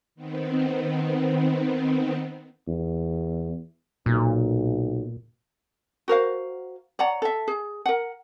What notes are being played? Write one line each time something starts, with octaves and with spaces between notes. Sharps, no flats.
D#3 B3 C4
E2
B1 A#2
F#4 A#4 C5 F5
C#5 D5 F#5 A#5
A4 E5
G#4
A#4 F#5